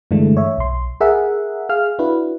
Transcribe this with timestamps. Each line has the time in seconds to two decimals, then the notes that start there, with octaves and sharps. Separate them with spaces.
0.11 G2 D3 E3 G#3 A3 D4
0.37 C#5 E5
0.58 B1 C6
1.01 G#4 A#4 E5 F#5
1.69 G#4 F5 F6
1.99 D4 E4 F#4 B4